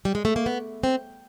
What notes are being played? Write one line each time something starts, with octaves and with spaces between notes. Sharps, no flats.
G3
G#3
A3
A#3
B3
C4